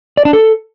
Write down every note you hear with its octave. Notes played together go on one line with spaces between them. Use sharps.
D5
D4
A4